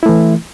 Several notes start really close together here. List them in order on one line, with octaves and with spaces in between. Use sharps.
E4 A3 E3